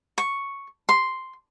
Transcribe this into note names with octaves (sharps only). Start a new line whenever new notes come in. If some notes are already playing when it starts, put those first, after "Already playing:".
C#6
C6